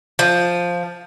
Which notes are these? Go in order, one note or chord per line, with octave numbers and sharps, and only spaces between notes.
F3